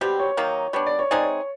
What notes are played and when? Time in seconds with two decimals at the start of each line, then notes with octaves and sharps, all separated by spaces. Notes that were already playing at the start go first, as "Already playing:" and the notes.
0.01 B2 G3 C4 G4
0.19 C#5
0.37 D#3 F#3 A#3 D#4
0.73 G3 B3 D4 C#5
0.86 D5
0.99 C#5
1.11 G#3 C4 D#4 G#4 D5
1.23 C#5